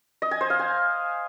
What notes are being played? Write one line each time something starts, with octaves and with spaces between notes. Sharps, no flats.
D#5
G#5
C5
F5
G#5